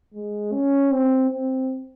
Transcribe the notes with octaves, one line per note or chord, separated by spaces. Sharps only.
G#3
C#4
C4
C4